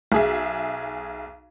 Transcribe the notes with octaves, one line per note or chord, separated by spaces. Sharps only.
B1 G#4 E5